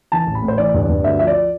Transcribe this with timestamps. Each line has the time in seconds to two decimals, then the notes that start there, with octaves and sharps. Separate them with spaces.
0.12 E3 A5
0.27 A1
0.35 B5
0.42 A2
0.48 C5
0.58 E3 D5
0.74 G2
0.81 D5
0.89 G2
1.04 D2 E5
1.19 F3 E5
1.27 D5